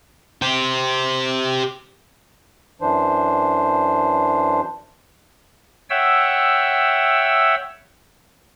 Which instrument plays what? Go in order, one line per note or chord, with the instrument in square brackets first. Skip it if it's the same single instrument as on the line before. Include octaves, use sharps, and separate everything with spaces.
[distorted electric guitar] G4 C5
[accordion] F#2 E3 D4 C5
[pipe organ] C#5 E5 F#5 G5 E6